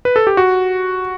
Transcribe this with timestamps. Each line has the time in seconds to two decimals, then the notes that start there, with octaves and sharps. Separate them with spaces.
0.05 B4
0.16 A4
0.27 G4
0.37 F#4